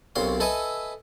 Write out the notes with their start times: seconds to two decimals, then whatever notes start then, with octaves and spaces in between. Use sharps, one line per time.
0.16 B1 F#2 C3 F5 C6
0.40 A4 B4 D#5 E5 G#5